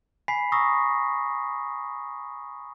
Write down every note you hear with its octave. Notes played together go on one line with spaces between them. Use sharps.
G#5 B5 B6 C7
A#5 C#6 D#6 E6 A#6